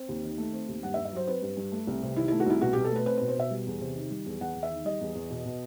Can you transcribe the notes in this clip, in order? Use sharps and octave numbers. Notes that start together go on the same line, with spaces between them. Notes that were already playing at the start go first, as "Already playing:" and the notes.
Already playing: C4
D#2
D#3
A3
C4
D#2
G2 F#5
E5
G2
E5
F#3 C5
C4 B4
G2
G2
A3
C2
C3
D#3 E4
A3 E4
F#4
C2 E4
B2 F#4
B2 G4
A4
A3 B4
C4 B4
B2 B4
C5
B2 E5
G3
E2
C3
D#3
G3
E2
E2 F#5
E2
E5
D#3
G3 D#5
E2
E2
B2
B2